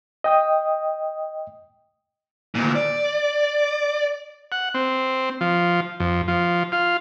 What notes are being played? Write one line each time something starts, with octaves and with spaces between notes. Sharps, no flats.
D#5 G5 D#6
D2 A#2
D5
F#5
C4
F3
F2
F3
F4